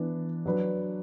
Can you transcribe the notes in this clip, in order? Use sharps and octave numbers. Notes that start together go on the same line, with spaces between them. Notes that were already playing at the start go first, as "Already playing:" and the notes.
Already playing: E3 B3 D4
F#3 D4 B4